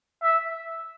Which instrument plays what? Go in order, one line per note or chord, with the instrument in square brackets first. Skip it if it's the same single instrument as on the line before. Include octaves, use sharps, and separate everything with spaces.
[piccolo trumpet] E5